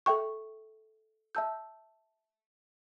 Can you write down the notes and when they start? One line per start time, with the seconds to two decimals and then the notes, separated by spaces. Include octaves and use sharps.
0.06 A4 E5 G5 C#6
1.35 E5 A5 E6 G6